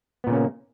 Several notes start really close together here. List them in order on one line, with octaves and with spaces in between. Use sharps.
B3 A#2 C#3 C#4 A#3